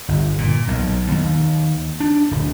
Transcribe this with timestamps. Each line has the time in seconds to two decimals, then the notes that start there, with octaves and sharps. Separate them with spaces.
0.08 G1
0.38 A#2
0.68 B1
1.11 D#2
2.00 D4
2.31 D1